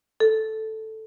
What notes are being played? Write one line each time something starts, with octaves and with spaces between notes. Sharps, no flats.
A4